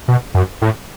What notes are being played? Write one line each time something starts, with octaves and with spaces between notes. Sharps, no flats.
B2
F#2
A2